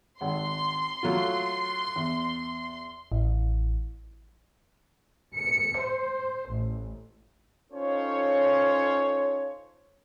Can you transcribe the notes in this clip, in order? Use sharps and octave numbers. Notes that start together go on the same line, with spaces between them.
G#1 F#5 C6
F#3 A3 F4
E2
A1
C#7
C5
A1
C#4 D#4 F4 A4 C5 C#5